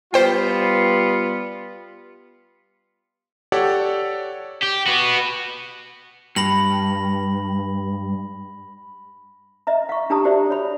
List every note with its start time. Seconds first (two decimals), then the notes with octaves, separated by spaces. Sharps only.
0.14 G3 B3 F4 C5 G5
3.52 G4 A4 C#5 D5 F#5
4.63 G4
4.86 B3 F#4
6.36 G2 B5 A#6 F#7
9.67 D#5 E5 A#5
9.89 F5 C#6
10.10 D4 G4 A5 A#5 D#6
10.24 F#4 G4 C5 D5 E5
10.50 C#5 B5